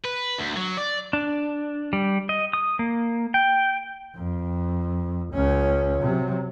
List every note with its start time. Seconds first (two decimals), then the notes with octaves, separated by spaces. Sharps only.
0.05 B4
0.39 D2
0.57 F#3
0.77 D5
1.13 D4
1.93 G3
2.29 D#5
2.53 D#6
2.79 A#3
3.34 G5
4.16 F2
5.34 C#2 C#4
6.02 C3 F#3